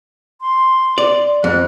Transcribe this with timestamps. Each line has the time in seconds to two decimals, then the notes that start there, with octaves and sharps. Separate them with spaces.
0.41 C6
0.98 D5
1.44 F2 F#6